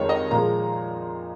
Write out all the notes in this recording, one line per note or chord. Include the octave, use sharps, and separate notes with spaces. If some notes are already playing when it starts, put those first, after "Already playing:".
Already playing: F2 D#3 G#3 C#5
D#5
A#2 F3 G#3 A#5